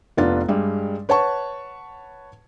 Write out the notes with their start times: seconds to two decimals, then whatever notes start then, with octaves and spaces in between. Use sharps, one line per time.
0.17 F1 B3 D4 F4 A6
0.48 G2 G3 G#3
1.09 B4 C#5 F#5 A5 C#6